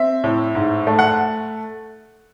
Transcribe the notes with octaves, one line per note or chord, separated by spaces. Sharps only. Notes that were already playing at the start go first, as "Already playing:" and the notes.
Already playing: C4 E5
A2
G#2
A3
F#5